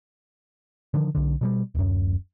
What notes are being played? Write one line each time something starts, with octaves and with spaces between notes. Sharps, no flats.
D3 D#3 F3
B1 D3
B2 F#3 G3
D1 F#2